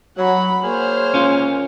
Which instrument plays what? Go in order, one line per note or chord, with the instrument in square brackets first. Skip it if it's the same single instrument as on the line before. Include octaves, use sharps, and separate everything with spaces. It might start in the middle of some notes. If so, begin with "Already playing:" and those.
[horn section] F#3 [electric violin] F#5 B5
[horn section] A#3 G#4 C#5 [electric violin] C5 F6
[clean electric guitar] C#4 F4